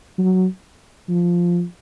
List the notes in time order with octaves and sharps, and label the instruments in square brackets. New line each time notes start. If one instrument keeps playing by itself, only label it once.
[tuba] F#3
F3